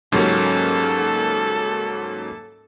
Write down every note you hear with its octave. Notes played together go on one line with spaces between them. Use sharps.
G#2 C#3 F#3 G3 A#3 C#4 A4